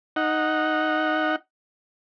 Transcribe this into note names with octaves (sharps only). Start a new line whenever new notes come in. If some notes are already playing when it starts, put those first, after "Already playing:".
D#4 F#5